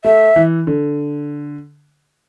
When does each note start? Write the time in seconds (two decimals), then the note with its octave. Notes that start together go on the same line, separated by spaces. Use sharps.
0.04 A3 E5
0.36 E3
0.67 D3